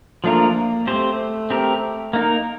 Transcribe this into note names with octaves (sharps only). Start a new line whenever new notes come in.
F3 A3 A#3 D4 F4 A#4
A3 C4 G4 C5
C4 G4 A#4
A#3 D#4 A#4